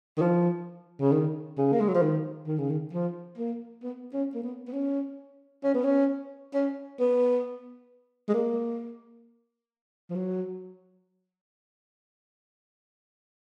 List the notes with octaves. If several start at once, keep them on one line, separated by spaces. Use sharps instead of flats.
D#3
F3
C#3
D#3
C#3
A#3
G#3
F#3
F3
D#3
D#3
C#3
D#3
F3
A#3
B3
C#4
A#3
B3
B3
C#4
C#4
B3
C#4
C#4
B3
G#3
A#3
F3
F#3